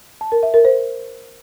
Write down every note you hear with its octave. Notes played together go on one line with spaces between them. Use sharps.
A5
A#4
E5
A#4
C5